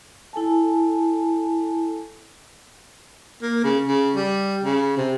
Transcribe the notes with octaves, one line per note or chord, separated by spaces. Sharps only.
E4 A4 G#5 A5
A#3
C#3
C#3
G3
C#3
C3